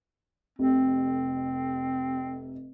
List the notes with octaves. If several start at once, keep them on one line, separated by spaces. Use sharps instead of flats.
F1 F2 C3 C4